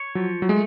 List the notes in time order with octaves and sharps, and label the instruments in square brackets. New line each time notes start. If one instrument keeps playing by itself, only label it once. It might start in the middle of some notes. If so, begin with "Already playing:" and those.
Already playing: [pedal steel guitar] C#5
[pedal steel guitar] F3 [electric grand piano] F#3
[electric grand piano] F#3
[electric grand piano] G#3 [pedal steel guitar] A3